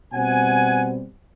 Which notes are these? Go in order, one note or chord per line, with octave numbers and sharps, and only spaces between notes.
B2 G3 C4 F#5 G#5